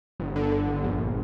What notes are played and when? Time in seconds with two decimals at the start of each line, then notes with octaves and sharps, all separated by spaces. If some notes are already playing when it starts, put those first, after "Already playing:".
0.20 G1
0.36 D3
0.52 D3
0.68 G1
0.84 A#1